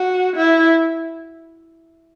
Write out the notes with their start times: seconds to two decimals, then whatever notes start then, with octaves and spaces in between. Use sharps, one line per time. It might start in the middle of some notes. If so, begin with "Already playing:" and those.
Already playing: F#4
0.37 E4